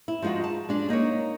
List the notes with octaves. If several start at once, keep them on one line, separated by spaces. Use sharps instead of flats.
E4
F3 G#3 D#4 F4 F#4
A5
G#3 D4 G#4
A#3 D#4 A#4 C#5